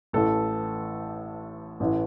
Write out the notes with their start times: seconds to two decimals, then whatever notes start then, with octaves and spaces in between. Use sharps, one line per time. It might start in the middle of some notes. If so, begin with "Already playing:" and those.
0.13 A1 A2 E3 A4
1.80 A1 A2 E3